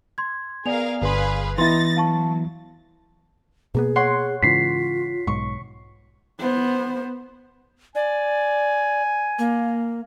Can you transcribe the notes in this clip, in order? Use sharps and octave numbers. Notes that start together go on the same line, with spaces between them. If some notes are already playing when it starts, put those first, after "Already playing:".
C6 G#6
B3 G#4 A#4 D5 F5 G#5 F7
G1 G#4 B4 F5 C6
E3 B3 D#4 E4 C6 A6 A#6
F#3 F5 A5 C#6
B2 A#3 B3 G#4
C#5 F#5 C6
G#2 C#3 E3 F4 B6 C7
B1 G#2 C#6
B3 C5
D5 G#5
A#3